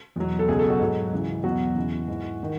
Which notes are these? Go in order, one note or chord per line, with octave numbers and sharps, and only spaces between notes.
E2 B2 F#3
A4
C#2 B2 F#3 G#4
A4
F#4
G#2 F#3
C#2 C#3 E3
E2 B2 F#3 F#4
E2 C#3 E3
G#2 E3
D#3